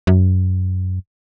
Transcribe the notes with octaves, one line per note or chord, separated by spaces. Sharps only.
F#2